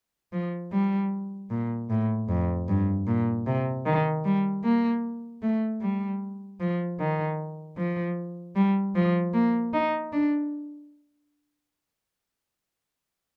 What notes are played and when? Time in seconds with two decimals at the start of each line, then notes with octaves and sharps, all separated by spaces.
0.33 F3
0.73 G3
1.50 A#2
1.90 A2
2.29 F2
2.68 G2
3.07 A#2
3.46 C3
3.86 D#3
4.25 G3
4.64 A#3
5.42 A3
5.81 G3
6.60 F3
6.99 D#3
7.77 F3
8.55 G3
8.95 F3
9.34 A#3
9.73 D#4
10.13 D4